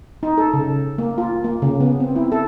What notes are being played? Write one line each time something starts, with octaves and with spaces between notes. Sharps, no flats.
D#4
A4
C#3
A#3
F4
A#3
C#3
B3
C4
E4
A4